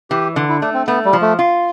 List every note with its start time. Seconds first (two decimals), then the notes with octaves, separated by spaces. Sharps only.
0.10 E3 G4
0.36 D3
0.49 E4
0.61 A3 D4
0.74 C4
0.87 A3 B3
1.05 G3
1.13 F3
1.21 A3
1.39 F4